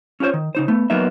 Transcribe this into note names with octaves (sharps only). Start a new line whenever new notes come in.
C#4 F4 G4 C5 C#5
D#3
C#3 D#4 C5
A3 B3
F#3 A#3 B3 D#4 E5